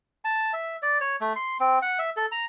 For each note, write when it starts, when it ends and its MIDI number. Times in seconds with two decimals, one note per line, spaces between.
0.25 0.52 81
0.53 0.76 76
0.82 0.98 74
1.01 1.16 73
1.21 1.33 57
1.36 1.57 84
1.60 1.79 60
1.82 1.99 78
1.99 2.10 76
2.17 2.26 69
2.32 2.45 82